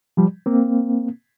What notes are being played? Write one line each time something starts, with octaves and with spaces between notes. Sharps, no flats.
F3 G3
A#3 C4